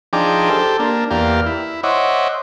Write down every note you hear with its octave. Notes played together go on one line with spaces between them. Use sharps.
F3 D4 D#4 G#4 G5 D6
G4 A4 C5
A#3 D4
E2 A#3 G4 D5 F5
E4
C5 C#5 D#5 E5 F#5 D6